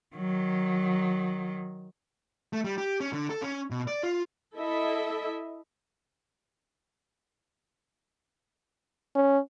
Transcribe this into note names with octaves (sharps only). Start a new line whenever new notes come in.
D#3 F#3
A3
G3
G4
C#4
D3
A4
C#4
B2
D5
F4
E4 A4 D#5 E5
C#4